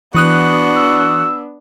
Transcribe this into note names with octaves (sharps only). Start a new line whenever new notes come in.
E3 B3 D4 F#4 D#6 F#6
E6